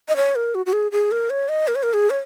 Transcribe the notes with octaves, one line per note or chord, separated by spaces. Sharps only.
D#5
C#5
A#4
F#4
F#4
G#4
G#4
A#4
C#5
D#5
A#4
C#5
A#4
G#4
C#5